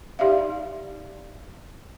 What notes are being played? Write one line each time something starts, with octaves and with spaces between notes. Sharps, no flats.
D#4 G4 D5 E5 F5